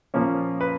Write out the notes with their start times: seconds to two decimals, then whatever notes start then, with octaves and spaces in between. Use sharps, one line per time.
0.14 A#2 F3 A#3 C#4
0.61 B4